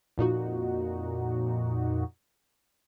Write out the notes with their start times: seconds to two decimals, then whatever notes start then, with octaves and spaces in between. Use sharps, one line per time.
0.18 F2 A#2 D#4 F#4